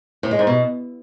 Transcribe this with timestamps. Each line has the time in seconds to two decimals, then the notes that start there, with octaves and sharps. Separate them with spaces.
0.23 A2
0.31 G#3
0.39 G#2
0.47 B2